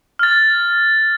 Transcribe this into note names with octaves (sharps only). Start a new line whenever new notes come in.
F6 A6